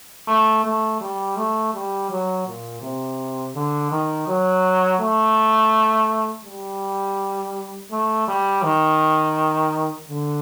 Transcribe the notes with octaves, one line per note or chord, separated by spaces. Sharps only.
A3
A3
G3
A3
G3
F#3
A#2
C3
D3
D#3
F#3
A3
G3
A3
G3
D#3
D3